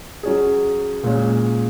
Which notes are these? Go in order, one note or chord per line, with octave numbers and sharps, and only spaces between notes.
F#3 C#4 G#4
A#2 G#3 C#4